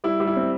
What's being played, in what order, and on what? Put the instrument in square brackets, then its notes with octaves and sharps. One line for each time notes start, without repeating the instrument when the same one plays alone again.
[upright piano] G3 [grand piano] E4
[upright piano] G3
[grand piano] E4
[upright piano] C4